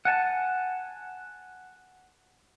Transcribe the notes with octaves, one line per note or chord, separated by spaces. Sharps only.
F#5 G#5 A5